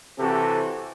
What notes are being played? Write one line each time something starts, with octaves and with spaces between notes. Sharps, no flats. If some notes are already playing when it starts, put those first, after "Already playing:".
C3 E3 C4 F#4 G4 A4